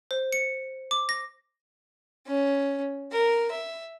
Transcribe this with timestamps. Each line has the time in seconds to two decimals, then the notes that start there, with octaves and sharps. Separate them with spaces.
0.11 C5
0.32 C#7
0.91 D6
1.09 A#6
2.27 C#4
3.12 A#4
3.51 E5